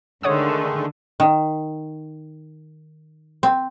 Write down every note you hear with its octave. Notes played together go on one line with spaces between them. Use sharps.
D3 D#3 G#3 A3 C#5 F#5 D#6
D#3
C4